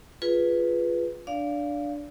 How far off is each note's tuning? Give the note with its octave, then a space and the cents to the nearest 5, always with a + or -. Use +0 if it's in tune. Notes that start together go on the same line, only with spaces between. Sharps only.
F4 +0 G#4 +0 B4 +0
D4 +0 D5 -25 F5 +0